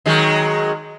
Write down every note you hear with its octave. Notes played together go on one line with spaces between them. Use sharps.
D#3 F#3 G#3